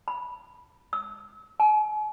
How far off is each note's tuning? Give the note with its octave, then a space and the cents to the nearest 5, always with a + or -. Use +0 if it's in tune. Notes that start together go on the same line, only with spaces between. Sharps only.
B5 -15
E6 -40
G#5 +40